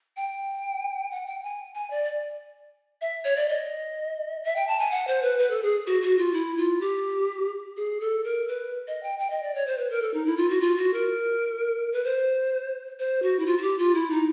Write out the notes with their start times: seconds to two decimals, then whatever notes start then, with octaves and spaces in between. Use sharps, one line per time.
0.17 G5
1.11 F#5
1.27 G5
1.43 G#5
1.75 G#5
1.90 D5
3.01 E5
3.25 C#5
3.36 D5
3.49 D#5
4.44 E5
4.56 G5
4.67 A5
4.79 G#5
4.91 F#5
5.07 C5
5.23 B4
5.39 B4
5.51 A4
5.63 G#4
5.87 F#4
6.02 F#4
6.18 F4
6.34 E4
6.57 F4
6.81 G4
7.77 G#4
8.00 A4
8.24 A#4
8.48 B4
8.87 D#5
9.03 G5
9.19 G5
9.30 D#5
9.43 D5
9.55 C#5
9.67 C5
9.78 B4
9.90 A#4
10.02 A4
10.14 D#4
10.26 E4
10.37 F4
10.49 F#4
10.61 F4
10.77 F#4
10.93 A#4
11.92 B4
12.04 C5
12.99 C5
13.22 F#4
13.39 E4
13.46 F4
13.57 F#4
13.62 G4
13.78 F4
13.95 E4
14.10 D#4